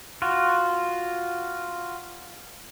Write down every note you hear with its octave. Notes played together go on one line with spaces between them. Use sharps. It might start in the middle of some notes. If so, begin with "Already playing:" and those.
F4 F#4